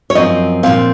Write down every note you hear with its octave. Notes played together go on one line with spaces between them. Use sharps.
C#5
F#2 F3 C4 D#5
A#2 F3 C4 F5